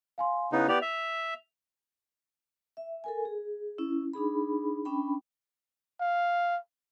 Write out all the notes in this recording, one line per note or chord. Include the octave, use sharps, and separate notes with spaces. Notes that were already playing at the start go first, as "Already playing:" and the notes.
F5 G#5 C6
C#3 B3 D#4 E4 F#6
B3 G4 D5 F7
E5
E5
A4 A#4 G#5
G#4
C#4 E4
D4 D#4 G#4 B5
C#4 D4 G5 B5
F5